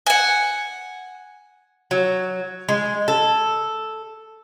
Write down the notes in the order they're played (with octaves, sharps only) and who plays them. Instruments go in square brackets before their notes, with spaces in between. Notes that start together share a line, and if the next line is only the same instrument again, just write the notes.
[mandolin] F#5 G#5
[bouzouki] F#3
G#3
A4